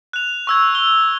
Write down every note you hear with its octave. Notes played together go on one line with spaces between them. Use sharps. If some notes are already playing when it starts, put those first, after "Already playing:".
F#6 F7
C#6 E6 G#6
G7